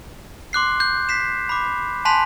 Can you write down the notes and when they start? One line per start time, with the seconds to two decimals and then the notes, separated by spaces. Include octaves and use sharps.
0.53 C6 D6 F#6 C7
0.80 G6
1.09 B6 C7 E7
1.49 B5 D6
2.05 G#5 A5 C6 F#6 B6 F7